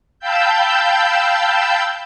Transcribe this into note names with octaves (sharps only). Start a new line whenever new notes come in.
F5 G5 A5 B5 E6 G6